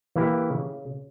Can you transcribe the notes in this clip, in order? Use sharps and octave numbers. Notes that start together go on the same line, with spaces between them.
E3 A#3 E4 G4
C#3